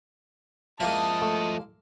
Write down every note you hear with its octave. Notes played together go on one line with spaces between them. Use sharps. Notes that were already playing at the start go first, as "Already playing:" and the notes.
F3 G#3 A#3 E4 D#5 A5
A3